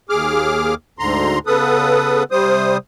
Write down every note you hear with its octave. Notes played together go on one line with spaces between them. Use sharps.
D#2 G#4 D6 F6
D2 G#2 D3 A#5 C6
C#3 B3 A4 B4 D#6
C3 G3 C5 D#6